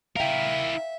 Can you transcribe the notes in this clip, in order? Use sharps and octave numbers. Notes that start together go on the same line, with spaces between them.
E4 A#4 E5 F5 G5